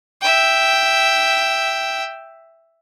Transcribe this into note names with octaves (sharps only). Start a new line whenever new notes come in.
E5 G5